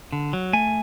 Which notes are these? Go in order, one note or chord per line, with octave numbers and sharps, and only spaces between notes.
D3
F#3
A3 G#5